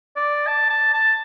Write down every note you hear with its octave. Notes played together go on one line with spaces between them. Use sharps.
D5
A5
A5
A5